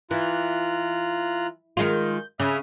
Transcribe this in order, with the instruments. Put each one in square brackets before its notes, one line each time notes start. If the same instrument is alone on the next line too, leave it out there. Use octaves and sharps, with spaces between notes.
[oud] E3 [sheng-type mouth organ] F4 A#5 F#6
[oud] D#3 G#3 F4
[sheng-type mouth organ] G6
[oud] C#3 [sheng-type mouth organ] E5 D#6 F6